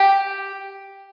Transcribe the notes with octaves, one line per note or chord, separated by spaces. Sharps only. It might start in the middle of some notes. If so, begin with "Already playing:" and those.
Already playing: G4